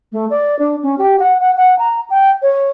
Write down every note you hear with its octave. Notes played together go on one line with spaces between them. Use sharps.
A3
D5
D4
C#4
G4
F#5
F#5
F#5
A#5
G5
C#5